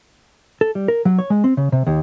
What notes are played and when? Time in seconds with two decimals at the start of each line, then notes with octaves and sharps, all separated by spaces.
0.61 A4
0.75 G3
0.88 A#4
1.05 F#3
1.19 C#5
1.30 G#3
1.44 C4
1.57 C#3
1.72 C3
1.87 D#2